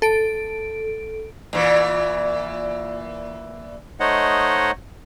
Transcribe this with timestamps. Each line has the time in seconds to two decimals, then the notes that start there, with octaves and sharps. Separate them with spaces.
0.02 A4 D7
1.53 A#2 E3
4.00 A3 D#4 C5 C#5 D#5 F#5